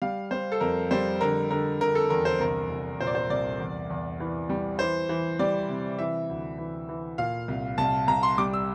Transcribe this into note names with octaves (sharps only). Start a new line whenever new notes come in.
G3 F5
G3 C5
A4
F2 A#4
G3 C5
D3 A#4
D3 A#4
D3 A#4
A4
E2 A#4
C5
C2 A#4
C2
A#2 C5
D5
C5
C2 D5
E2
E2
E3
G3
E3 C5
E3
G3 D5
C3
E3 E5
D2
E3
E3
A#2 F5
C2
C2 A5
C2 A#5
C6
G3 D6
E6